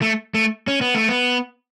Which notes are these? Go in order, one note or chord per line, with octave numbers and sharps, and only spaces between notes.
A3
A3
C#4
B3
A3
B3